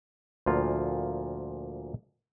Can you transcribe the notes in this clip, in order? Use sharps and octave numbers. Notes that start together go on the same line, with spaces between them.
D2 A#2 F3 A#3 F4